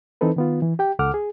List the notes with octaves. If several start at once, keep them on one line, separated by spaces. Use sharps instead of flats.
E3 C4 D#4 A4 B4
D#3 B3 F4
E3
G4 G5
C#2 A4 F#5 D6 F6
G#4